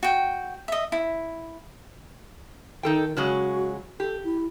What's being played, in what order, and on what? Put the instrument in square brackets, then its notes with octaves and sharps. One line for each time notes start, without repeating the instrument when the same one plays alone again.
[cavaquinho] F#4 G5
D#5 E5
E4
[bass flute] D#3 [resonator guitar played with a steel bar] D#4 A4 G5
[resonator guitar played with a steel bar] C#3 F#3 G#3 [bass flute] F#4
[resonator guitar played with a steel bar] G4 [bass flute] A4
[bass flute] E4